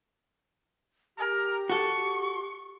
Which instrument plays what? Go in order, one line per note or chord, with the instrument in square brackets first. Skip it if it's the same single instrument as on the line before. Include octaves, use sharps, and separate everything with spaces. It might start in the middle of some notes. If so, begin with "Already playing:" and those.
[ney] G4 [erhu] A#4
[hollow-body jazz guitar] F#4 A4 [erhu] C#6